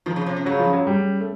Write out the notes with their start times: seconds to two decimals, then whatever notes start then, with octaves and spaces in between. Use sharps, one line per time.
0.06 D#3 F3
0.16 C#3
0.26 C3
0.37 C3
0.46 C#3 F#3
0.59 F3
0.73 F#3
0.87 G3
1.21 A3